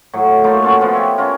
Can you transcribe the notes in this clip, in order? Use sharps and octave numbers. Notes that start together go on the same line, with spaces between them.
A2 F#3
A3 A#3 D#4 F4
C#4 F4 F#4 A4
F3 B3 F4
G4 C#5 E5
C#4 F4 A#4